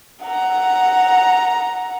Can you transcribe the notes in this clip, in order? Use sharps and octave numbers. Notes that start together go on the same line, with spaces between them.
F#5 A#5